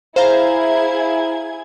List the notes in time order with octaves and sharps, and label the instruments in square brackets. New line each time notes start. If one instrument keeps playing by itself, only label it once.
[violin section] E4 G#4 G#6 [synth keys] C5 F5 A#5